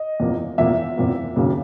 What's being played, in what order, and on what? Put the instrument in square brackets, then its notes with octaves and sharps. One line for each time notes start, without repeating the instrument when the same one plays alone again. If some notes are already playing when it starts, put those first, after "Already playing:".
Already playing: [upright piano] D#5
E2 C3 F3 A#3
E2 C3 F3 A#3 E5
E2 C3 F3 A#3
D#2 C#3 F#3 A#3